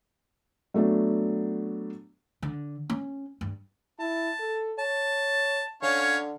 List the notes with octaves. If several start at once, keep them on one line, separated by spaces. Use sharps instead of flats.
F#3 A3 B3 D4
D3
C#4
G2
E4 A5
A4
C#5 A5
D3 C#4 C#5 F5